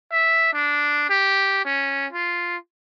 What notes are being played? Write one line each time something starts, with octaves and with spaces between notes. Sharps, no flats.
E5
D4
G4
C#4
F4